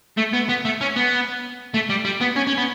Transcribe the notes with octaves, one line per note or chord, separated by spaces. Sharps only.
A3
B3
B3
A3
C#4
B3
A3
G3
G3
B3
C#4
C#4
B3